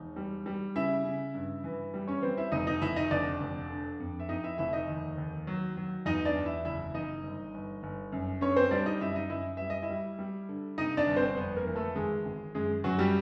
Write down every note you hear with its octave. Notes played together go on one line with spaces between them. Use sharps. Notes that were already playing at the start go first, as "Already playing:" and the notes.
Already playing: E1 D#4
G3
G3
C#3 E4 E5
C#3
G2
E3
G3
C#4 C#5
E3 C4 C5
E4 E5
F1 D#4 D#5
D#4 D#5
F1 E4 E5
D#4 D#5
F1 D4 D5
F1
D3
F2
E5
F2 D#4 D#5
E4 E5
F1 E4 E5
D#4 D#5
D#2
D#2
F#3
F#3
E2 D#4 D#5
D4 D5
E2
E4 E5
F#1 E4 E5
E2 D#4 D#5
G1
G1
G1
F#2
D3 C#4 C#5
C4 C5
G3 D4 D5
D#4 D#5
F#2 E4 E5
D#4 D#5
F#2 E4 E5
G3 E5
D#5
E4 E5
G3
G3
D3
C3 D#4 D#5
D4 D5
G1
C4 C5
F2 B3 B4
A#3 A#4
E3
A3 A4
G#1 G#3 G#4
G#1
F#2 G#3 G#4
F#2 F#3 F#4
G3 G4